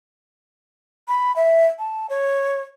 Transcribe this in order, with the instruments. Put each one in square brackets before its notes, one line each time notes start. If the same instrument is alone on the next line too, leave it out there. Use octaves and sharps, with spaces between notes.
[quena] B5
E5
A5
C#5